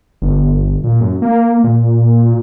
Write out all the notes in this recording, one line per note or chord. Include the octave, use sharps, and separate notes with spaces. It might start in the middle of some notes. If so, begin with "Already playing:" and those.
G1
A#2
F#2
A#3
A#2